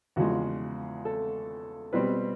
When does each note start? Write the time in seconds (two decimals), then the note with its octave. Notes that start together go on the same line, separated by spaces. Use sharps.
0.16 E2 C#3 F3 G#3 F#4
1.05 A4
1.93 B2 G3 C4 B4